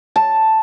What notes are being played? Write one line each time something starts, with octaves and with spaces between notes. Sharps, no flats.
A5